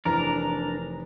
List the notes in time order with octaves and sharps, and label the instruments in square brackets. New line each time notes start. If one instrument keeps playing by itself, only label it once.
[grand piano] F1 E3 A#5 [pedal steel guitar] D4 A#4